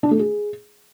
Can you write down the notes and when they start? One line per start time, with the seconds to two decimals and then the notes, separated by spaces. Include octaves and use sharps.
0.03 D4
0.11 A3
0.19 G#4